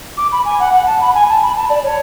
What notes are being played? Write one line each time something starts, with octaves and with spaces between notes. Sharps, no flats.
D6
B5
G#5
F#5
F#5
A5
B5
G#5
A5
B5
A5
D5
C#5